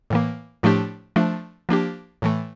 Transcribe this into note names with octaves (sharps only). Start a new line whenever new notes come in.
A2 E3 A#3
A2 F3 A3 D4 G4
F3 A3 D4
F3 A#3 D4 G4
A2 E3 A3